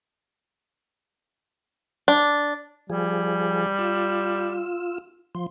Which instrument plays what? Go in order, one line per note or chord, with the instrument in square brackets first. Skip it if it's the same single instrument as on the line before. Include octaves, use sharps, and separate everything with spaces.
[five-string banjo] D4
[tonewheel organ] F3 G#4 [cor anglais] G3
[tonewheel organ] F4 E6
F3 C6